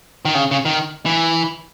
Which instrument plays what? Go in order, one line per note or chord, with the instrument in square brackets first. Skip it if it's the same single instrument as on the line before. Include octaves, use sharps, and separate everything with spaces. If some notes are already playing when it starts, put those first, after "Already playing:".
[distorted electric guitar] D#3
C#3
C#3
D#3
E3